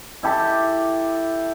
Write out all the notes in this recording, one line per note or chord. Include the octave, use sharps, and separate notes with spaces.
E4 G4 A4